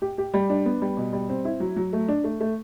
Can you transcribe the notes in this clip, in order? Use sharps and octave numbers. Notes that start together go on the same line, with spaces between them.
G4
G4
G3
D4
B3
G3
B2
G3
C4
E4
F#3
F#3
A3
D4
A3
A3